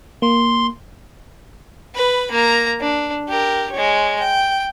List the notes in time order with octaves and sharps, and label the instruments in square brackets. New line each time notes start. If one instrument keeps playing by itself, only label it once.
[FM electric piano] A#3 [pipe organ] C6
[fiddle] B4 B5
A#3 A#5
D4
G4 A#4
G#3 C#5
G5